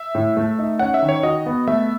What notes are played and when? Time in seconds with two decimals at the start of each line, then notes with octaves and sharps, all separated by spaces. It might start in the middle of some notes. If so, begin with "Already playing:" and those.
Already playing: E5
0.15 A2
0.37 A3
0.59 D#4
0.79 C#4 F#5
0.94 E5
1.02 D#3
1.09 C#5
1.23 F#4 D#5
1.46 B3
1.68 A3 E5